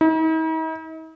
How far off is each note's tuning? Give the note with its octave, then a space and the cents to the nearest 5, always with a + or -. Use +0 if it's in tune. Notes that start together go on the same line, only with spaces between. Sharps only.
D#4 +45